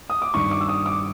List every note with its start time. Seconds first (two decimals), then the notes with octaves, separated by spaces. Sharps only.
0.10 D#6
0.22 D6
0.34 G2 D#3 C#6
0.51 D6
0.61 E6
0.68 D#6
0.86 D6